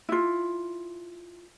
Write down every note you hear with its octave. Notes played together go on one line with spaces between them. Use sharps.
E4 F4